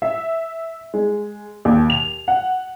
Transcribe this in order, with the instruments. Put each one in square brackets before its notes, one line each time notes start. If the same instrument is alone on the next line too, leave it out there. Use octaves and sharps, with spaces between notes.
[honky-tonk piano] E5
G#3
D#2
F7
F#5